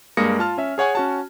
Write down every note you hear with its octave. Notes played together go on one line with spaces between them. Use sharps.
G2 G#3 A#3 D#6 A#6 C#7
F4 A5 F6
C#4 E5
G#4 C#5 F#5 G#5 C#6
C#4 F#4 A5